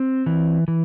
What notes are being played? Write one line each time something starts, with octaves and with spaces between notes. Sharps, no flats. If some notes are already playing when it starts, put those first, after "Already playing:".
Already playing: C4
E3
E3